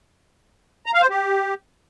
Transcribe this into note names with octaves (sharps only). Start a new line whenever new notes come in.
A#5
F5
C5
G4